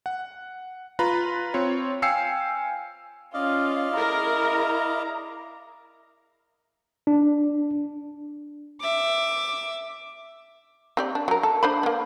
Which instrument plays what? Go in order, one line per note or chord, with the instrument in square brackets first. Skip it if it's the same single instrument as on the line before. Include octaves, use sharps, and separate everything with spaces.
[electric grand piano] F#5
F4 B4 A#5 B5
C4 F4 C#5
F5 G5 G#5 E6 C7 C#7
[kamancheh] C#4 F4 [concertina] D5 D#5 F5
[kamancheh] E4 A#5 [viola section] G#4 A#4
[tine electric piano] D4
[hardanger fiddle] E5 D6
[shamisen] C4 G4 D5
D4
F#3 A#4
A4
D4 C5 B5
A#3 B3